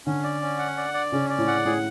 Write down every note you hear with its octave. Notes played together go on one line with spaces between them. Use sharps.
D3 C#4
D5
C#4
F#5
D5
D5
C#3 C#4
D5
A2
F#5
A2 G#4